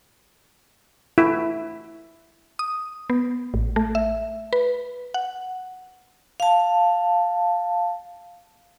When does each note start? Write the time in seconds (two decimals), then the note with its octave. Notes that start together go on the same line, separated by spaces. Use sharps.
1.18 E4
2.59 D#6
3.10 B3
3.54 A1
3.76 A3
3.95 E5
4.53 B4
5.14 F#5
6.40 F5 A5